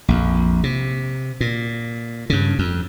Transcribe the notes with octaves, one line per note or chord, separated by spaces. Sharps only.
A#1 F2
C3
A#2
G2 C#3
F2